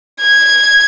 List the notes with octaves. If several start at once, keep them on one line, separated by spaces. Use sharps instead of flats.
G#6